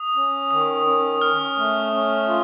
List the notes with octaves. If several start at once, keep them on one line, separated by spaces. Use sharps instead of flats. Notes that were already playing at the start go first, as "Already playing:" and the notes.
Already playing: D#6
C#4
D#3 D#6
C#4
C#4 F6
A3
C#4
F4